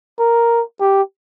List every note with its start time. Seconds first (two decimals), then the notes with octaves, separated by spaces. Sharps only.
0.19 A#4
0.80 G4